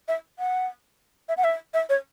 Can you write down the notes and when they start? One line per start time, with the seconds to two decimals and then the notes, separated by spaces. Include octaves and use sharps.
0.08 E5
0.39 F#5
1.29 E5
1.37 F#5
1.44 E5
1.74 E5
1.89 C#5